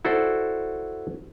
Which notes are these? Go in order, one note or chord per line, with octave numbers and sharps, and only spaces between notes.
E4 F#4 A4 C5 D5